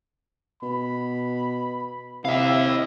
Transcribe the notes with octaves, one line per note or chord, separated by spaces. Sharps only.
B2 B5
C3 E4 D#5 F5